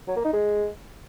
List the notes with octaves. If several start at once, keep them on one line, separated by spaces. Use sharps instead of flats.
F#3
A#3
D#4
G#3